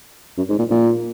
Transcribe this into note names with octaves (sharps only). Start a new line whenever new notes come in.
F#2
G#2
A#2
A#2